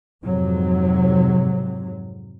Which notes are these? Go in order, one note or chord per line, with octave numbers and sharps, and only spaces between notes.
F2 G#2 C3 F#3